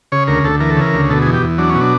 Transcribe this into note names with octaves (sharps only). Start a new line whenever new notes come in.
C#3 C#5
D2 A#4
D2 A4
E3 A#4
A4
C#3 A#4
D2
B2 A4
G#4
E2
G4
E2
F#3 D4
C#4
B2
D4